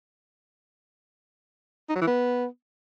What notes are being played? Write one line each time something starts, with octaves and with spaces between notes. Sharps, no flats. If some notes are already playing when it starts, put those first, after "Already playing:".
D#4
F#3
E3
B3